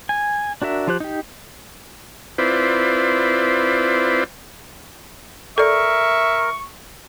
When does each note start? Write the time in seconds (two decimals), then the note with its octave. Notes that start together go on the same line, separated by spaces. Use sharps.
0.09 G#5
0.62 D4 F#4 A#4 E5
0.87 F3 F4 G4 C5 F#6
1.00 D#4 G4
2.38 C4 E4 F4 B4 C5 D5
5.58 A4 A#4 D5 E5 C#6